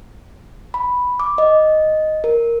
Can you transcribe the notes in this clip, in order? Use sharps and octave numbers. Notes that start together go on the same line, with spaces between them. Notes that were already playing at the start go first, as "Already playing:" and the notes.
B5
D6
D#5
A#4